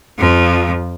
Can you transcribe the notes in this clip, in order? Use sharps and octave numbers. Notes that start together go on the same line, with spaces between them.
F2 F3